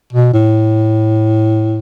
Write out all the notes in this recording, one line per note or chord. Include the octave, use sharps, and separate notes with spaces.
B2
A2